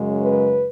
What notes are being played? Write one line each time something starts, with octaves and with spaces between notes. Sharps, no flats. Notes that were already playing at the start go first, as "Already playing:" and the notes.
Already playing: F#2 C#3 G#3
B4